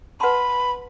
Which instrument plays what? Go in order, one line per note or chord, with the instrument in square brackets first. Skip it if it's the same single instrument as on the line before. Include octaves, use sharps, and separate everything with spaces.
[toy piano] B4 F#5 A5 C6 [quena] B5